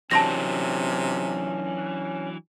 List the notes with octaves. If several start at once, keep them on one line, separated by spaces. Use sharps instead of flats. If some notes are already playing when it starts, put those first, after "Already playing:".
C3 E3 F#3 C#4 D4 A5 C6 A#6